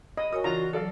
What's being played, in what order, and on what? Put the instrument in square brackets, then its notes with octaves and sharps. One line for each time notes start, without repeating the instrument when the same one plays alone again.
[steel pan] D#5 [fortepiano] B5
[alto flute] F#4 [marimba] A#4 C#5 G#5 [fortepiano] D#6
[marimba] C#3 E3 [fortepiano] D4 F4 [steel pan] A#5
[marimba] F#3 A5 [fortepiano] A4 D5 F5